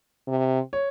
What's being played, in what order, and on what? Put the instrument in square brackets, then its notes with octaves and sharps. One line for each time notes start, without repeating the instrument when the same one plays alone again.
[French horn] C3
[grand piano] C#5